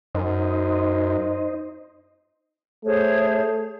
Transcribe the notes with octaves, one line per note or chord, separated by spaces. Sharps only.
F#2 D#4 C5 D#5
A3 G#4 C5 C#5